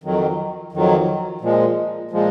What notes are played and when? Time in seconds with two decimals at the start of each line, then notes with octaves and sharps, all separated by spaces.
0.04 F2 D#3 F#3
0.72 F2 D#3 F#3
1.41 A#2 F3 G#3
2.11 A#2 F3 G#3